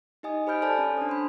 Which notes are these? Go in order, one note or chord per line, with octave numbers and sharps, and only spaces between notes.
D#4 G4 D#5 G#5 D#6
G4 C5 B5 F6 G6 D7
A4 C5 D5 G#5 A5
C#4
D4 D#6
B5 C6